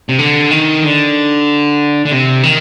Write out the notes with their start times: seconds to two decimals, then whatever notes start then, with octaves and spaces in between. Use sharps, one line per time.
0.09 C3
0.19 D3
0.51 D#3
0.83 D3
2.06 D3
2.11 C3
2.43 D#3